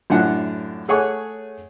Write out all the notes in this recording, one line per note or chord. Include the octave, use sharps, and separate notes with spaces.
F#2 A2 D4 F4 F#5
A3 G#4 C#5 F#5 G#5 C#6